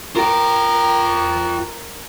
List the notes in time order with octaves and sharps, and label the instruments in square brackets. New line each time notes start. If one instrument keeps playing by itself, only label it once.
[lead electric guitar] F4 G5 [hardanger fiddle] A#4